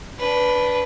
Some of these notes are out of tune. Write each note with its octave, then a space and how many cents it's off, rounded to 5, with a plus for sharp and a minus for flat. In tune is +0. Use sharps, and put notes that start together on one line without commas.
D4 -15 B4 +0